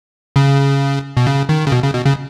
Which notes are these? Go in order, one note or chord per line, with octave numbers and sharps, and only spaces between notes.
C#3
B2
C#3
D#3
C#3
B2
C#3
B2
C#3